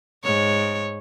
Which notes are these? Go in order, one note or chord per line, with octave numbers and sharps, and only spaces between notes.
G#2 C#5